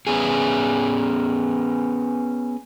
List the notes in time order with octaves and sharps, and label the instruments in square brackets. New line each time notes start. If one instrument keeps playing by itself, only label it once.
[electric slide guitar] B3 C#4 G#4